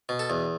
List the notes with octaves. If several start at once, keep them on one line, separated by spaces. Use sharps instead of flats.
B2
A4
E2